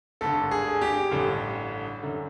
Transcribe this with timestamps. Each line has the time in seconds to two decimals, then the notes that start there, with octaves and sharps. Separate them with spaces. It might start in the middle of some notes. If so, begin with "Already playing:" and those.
0.21 G#1 G2 D3 A4
0.51 G#4
0.81 G4
1.11 A1 G2 D3
2.03 F#2 D3